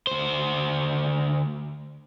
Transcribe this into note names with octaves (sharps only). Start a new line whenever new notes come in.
D2 C5